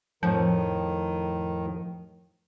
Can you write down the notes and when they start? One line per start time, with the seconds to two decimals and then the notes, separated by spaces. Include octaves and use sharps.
0.23 F2 A2 D#3 F3